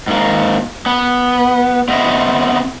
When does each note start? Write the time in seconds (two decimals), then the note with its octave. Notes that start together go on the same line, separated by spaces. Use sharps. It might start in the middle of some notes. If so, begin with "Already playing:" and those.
0.07 G#2 A#3
0.86 B3
1.88 B3 C4 D#5 E5